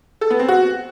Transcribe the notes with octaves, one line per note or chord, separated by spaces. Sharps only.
A4
B3
C4
F#4